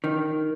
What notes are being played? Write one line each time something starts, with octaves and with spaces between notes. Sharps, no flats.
D#3